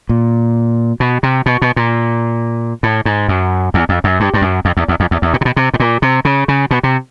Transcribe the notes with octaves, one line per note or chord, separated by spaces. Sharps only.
A#2
B2
C3
B2
B2
A#2
A2
G#2
F#2
E2
F2
F#2
G2
G2
F#2
F2
E2
E2
F2
E2
E2
A#2
C3
B2
C3
A2
A#2
C3
C#3
C#3
B2
C3